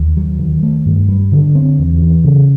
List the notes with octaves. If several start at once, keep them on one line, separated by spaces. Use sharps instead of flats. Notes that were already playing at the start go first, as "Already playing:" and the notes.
Already playing: D#2
F#3
D#3
A3
G2
G3
D3
C4
E2
E3
C#3